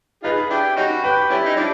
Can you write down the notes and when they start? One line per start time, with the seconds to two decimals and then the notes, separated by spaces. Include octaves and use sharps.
0.23 D#4 F4 G#4 B4
0.50 D4 E4 G4
0.76 C#4 D#4 F#4
1.03 G4 B4
1.30 G3 C#4 E4
1.45 D#4
1.56 F3 G3 D4